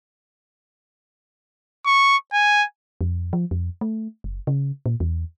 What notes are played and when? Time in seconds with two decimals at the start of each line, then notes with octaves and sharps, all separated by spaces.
1.86 C#6
2.33 G#5
3.01 F2
3.33 F3
3.51 F2
3.81 A3
4.24 F#1
4.47 C#3
4.86 A#2
5.00 E2